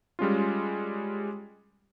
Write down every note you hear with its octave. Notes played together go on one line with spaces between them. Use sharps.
G3 G#3 C#4 F4